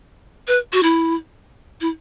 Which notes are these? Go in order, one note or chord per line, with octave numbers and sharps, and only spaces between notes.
B4
F#4
E4
E4